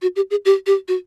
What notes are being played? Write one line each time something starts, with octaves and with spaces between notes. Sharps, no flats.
F#4
G4
G#4
G4
G4
F#4